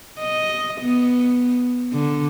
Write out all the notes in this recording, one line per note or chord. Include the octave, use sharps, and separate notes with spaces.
D#5
B3
D3